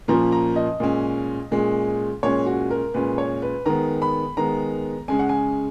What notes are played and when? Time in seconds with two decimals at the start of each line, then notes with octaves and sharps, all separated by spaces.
0.08 A#2 F3 A#3 C#4 A#5
0.32 A#5
0.56 D#5
0.80 A#2 G#3 C#4
1.51 A#2 G#3 C#4
2.23 A#2 G#3 C#4 C#5
2.46 F#4
2.71 A#4
2.94 A#2 G#3 C#4 B4
3.18 C#5
3.42 B4
3.66 D#3 G#3 B3 A#5
4.02 B5
4.37 D#3 G#3 B3 A#5
5.08 C#3 G#3 C#4 G#5
5.19 F#5
5.29 G#5